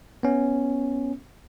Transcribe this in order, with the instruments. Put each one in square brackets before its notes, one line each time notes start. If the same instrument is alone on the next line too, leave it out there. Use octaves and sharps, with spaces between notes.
[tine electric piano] B3 C#4